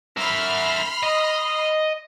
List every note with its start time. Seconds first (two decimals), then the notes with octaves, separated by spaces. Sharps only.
0.17 A#4 E5 B5 C6 F6
1.03 D#5